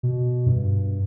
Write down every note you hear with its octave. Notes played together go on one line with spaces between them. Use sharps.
B2
G2